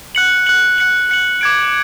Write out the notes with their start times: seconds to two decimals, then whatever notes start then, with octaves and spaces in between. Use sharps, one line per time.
0.15 F#6 C#7 F#7
0.46 F#6 C#7 F#7
0.78 F#6 C#7 F#7
1.10 F#6 C#7 F#7
1.41 D6 G#6 D7